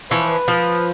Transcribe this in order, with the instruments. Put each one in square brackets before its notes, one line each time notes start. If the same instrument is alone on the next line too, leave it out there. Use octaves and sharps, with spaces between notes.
[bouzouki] E3 F3 C#5 [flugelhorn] B4
[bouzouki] F3